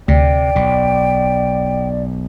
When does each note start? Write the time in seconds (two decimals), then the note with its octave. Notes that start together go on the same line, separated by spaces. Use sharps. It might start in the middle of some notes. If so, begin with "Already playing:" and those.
0.08 D2 C3 D5 G5
0.55 B1 B2